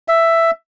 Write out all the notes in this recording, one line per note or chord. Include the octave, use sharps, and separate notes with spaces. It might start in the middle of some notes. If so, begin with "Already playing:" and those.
E5